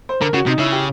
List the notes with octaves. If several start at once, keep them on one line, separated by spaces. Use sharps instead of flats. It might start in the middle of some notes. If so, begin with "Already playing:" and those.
C5
D3 A#4
C#3 F#4
C3 D#4
C#3 E4
G4